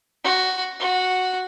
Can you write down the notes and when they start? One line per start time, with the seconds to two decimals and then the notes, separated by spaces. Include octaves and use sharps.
0.24 F#4
0.80 F#4